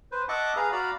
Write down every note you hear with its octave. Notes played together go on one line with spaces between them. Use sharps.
B4 C5
D#5 E5 F#5 A5 C#6 D6
G#4 B4 F5 A#5
F#4 D5 F5 A#5 B5